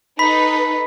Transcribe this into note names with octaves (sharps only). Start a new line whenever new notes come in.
D#4 A4 B4 B5 B6